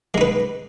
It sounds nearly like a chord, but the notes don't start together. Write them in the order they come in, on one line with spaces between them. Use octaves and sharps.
G#3 D#4 B4